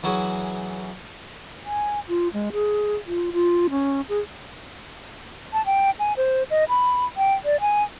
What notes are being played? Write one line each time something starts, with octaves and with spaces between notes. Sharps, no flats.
E3 F#3 C#4 E4 F#4 G#4
G#5
F4
G#3
G#4
F4
F4
C#4
G#4
A5
G5
G#5
C5
D#5
B5
G5
D5
G#5